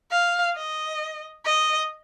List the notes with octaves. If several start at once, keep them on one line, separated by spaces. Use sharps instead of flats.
F5
D#5
D#5